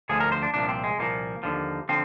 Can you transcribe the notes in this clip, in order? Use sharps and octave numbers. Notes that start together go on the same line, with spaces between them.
D2 D3 F3 G#4
A#4
C5
D4
C2 A#2 F3 D4
C4
G#3
C2 A#2 F3 A#3
D#2 D3 F3
D3 F3 C4